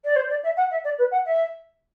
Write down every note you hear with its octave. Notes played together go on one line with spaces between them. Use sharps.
D5
C5
D5
E5
F#5
E5
D5
B4
F#5
E5